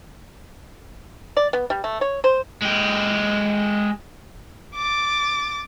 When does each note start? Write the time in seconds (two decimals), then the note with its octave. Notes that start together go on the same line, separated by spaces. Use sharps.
1.37 D5
1.53 B3
1.70 G3
1.84 A3
2.01 C#5
2.24 C5
2.62 G#3 G4
4.76 D6 A6